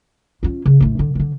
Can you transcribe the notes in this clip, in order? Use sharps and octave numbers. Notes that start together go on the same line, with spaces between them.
C#4 F4
C#3
A1 A3
D3
D3 D#3